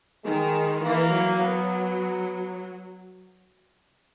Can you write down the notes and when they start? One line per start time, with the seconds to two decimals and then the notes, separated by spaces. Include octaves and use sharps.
0.24 D#3 G#3
0.83 E3 A#3
1.12 F#3
1.40 B3